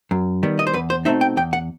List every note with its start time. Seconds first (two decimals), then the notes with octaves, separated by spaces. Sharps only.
0.11 F#2
0.43 D#3 G3 B3
0.59 D#5
0.67 C5
0.74 E2 B4
0.90 C5
1.05 B2 A3 C4 D#4 E5
1.21 G5
1.37 E2 G5
1.53 F#5